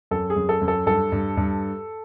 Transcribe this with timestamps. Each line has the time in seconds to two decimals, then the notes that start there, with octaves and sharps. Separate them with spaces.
0.11 F#2 A4
0.30 G#4
0.36 F#2
0.49 A4
0.61 F#2
0.68 A4
0.86 G2 A4
1.12 G2
1.37 G2